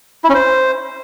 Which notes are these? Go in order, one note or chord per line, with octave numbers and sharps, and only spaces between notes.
E4
C#4
C5